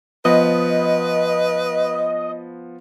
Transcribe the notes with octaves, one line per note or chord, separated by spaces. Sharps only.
F3 B3 B4 D#5